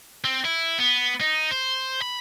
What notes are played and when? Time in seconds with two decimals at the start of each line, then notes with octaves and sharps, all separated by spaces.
0.24 C4
0.45 E4
0.78 B3
1.21 D#4
1.51 C5
2.02 B5